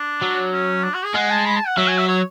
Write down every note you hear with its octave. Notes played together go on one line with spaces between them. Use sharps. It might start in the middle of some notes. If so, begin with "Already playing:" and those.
Already playing: D4
F#3
C#4
D4
F#4
G#4
G#3 F#5
A5
B5
A5
F#5
F#3 E5
G#5
E5
C#5